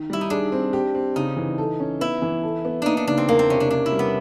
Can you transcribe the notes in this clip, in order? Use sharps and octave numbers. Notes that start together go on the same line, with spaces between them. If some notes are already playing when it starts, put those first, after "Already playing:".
Already playing: D#3
G3 E4
D#4
D4 G#4
C4
G4
C4
C#3 D#4
E3
A4
C#4
B3 E4
E3
A4
B3
A#3 D4 D#4
D4
C#3 D4
C4
E2 A#3
C4
C3 C#4
D4
C#4 D4
E4
G3
B3